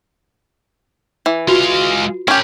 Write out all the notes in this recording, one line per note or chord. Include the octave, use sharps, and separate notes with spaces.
E3
G#3 F4 F#4 F5
C#4 G4 A#4 B5